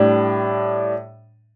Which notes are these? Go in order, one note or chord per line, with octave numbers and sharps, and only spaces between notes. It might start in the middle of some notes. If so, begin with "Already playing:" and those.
Already playing: A2 G3 D4